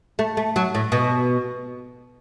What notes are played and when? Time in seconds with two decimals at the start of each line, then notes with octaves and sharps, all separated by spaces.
0.19 A3
0.37 A3
0.56 F#3
0.74 A2
0.92 B2